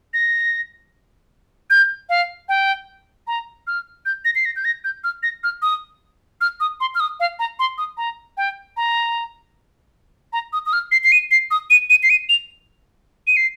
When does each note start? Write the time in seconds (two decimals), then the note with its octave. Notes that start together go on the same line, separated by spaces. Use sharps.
0.14 A#6
1.70 G6
2.09 F5
2.49 G5
3.27 A#5
3.67 F6
4.06 G6
4.25 A#6
4.35 C7
4.45 A#6
4.56 G6
4.65 A#6
4.84 G6
5.04 F6
5.23 A#6
5.44 F6
5.62 D#6
6.41 F6
6.60 D#6
6.80 C6
6.95 F6
7.00 D#6
7.20 F5
7.39 A#5
7.59 C6
7.78 D#6
7.97 A#5
8.37 G5
8.77 A#5
10.33 A#5
10.53 D#6
10.66 D#6
10.73 F6
10.92 C7
11.04 C7
11.12 D#7
11.31 C7
11.51 D#6
11.70 D#7
11.90 D#7
12.03 C7
12.10 D#7
12.29 F7
13.27 D#7
13.36 C7